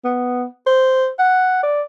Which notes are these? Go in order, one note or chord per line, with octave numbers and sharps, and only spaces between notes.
B3
C5
F#5
D5